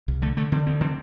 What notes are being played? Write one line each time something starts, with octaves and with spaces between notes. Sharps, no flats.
C2
D3 A3
D3 A3
D3 C4
D2 C4
D3 C4